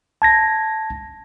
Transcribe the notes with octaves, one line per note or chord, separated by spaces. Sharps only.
A5 G#6 A#6